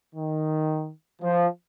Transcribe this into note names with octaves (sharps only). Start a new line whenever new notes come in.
D#3
F3